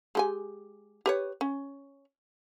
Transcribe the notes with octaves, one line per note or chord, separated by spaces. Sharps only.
G#3 G4 G#5
G4 B4 C#5
C#4